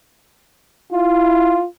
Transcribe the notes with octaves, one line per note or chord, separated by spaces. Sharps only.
E4 F4